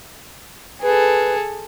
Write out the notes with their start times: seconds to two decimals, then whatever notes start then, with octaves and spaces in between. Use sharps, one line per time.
0.82 G#4 A4 B4